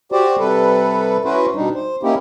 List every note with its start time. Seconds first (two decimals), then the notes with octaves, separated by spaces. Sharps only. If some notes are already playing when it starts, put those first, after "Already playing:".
0.12 F#4 G4 C5 D5
0.39 C3 G3 A4 B4
1.25 C#4 E4 F#4 B4 C5
1.56 B2 G3 D4 D#4
1.75 C5
2.03 A#3 C#4 D#4 E4 G4